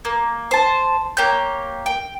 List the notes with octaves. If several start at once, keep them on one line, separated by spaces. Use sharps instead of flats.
A#3
C5 A5
A#3 G4 C#5 G6
G5